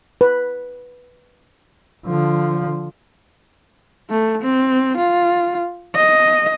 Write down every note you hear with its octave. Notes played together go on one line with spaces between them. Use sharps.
B4
D3 F3
A3
C4
F4
D#5